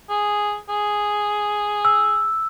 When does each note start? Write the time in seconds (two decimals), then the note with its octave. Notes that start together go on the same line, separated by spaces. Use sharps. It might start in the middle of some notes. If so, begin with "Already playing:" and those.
0.09 G#4
0.69 G#4
1.85 E6